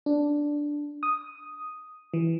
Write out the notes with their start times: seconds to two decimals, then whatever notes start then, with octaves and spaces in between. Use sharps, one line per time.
0.06 D4
1.03 D#6
2.14 E3